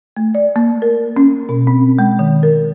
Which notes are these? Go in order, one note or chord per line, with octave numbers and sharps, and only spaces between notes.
A3
D5
A#3
A#4
C#4
B2
C4
G#3
D#3
A#4